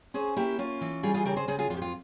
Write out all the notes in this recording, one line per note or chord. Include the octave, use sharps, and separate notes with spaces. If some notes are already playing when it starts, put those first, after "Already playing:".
C#4 G#4 C5
A#3 E4 G4
C#4 F4
E3
G3 F4 G#4
F4 G#4
C#3 G4 A#4
G#4 C5
C#3 G#4 C5
F4 G#4
F2 F4
G4
F4